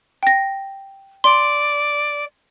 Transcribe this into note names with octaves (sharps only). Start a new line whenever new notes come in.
G5 A#6
D5 C6